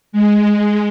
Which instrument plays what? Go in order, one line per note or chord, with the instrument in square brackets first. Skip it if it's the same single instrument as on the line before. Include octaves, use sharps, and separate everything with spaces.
[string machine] G#3